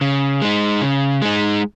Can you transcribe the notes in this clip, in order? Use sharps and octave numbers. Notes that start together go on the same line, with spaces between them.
C#3
G#3 D#4
C#3
G#3 D#4